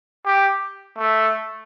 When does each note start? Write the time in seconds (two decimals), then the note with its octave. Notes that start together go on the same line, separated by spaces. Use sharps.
0.26 G4
0.98 A3